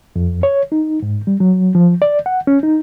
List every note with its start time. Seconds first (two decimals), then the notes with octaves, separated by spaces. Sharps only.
0.16 F2
0.43 C#5
0.72 D#4
1.02 G#2
1.27 G3
1.40 F#3
1.75 F3
2.02 D5
2.26 F#5
2.47 C#4
2.63 D#4